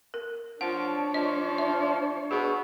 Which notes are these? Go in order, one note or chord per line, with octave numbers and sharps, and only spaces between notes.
A#4
F3 D4 C#5 F#5
F3 D#5
E5
B2 G#4